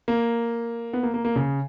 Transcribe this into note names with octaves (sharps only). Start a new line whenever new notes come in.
A#3
B3
A#3
A#3
A#3
C#3